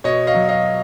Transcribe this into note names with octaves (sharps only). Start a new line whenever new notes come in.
B2 C#5 D#5
D#5 F5
F#3
D#5 F5